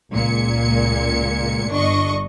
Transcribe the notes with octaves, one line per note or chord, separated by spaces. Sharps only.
C#2 A#2 G#6 C#7
G1 D4 D#5 C#6